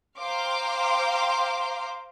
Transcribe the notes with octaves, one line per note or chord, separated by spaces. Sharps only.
C5 F5 G5 A#5 C6 D6